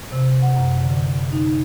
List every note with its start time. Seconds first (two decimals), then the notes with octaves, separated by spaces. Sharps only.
0.12 C3
0.42 F#5
0.56 F#2
0.84 D3
1.33 D#4